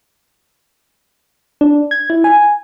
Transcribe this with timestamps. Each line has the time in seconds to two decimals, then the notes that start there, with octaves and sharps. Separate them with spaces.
1.61 D4
1.91 G#6
2.10 E4
2.24 G#5